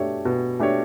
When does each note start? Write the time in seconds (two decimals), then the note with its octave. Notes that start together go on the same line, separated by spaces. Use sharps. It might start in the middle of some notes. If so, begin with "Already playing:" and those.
Already playing: B2 A3 D4 G4 C#5
0.25 B2
0.59 A3 D4 G4 C#5